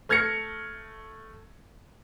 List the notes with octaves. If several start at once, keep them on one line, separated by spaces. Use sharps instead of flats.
A3 F6 G#6 A#6 C#7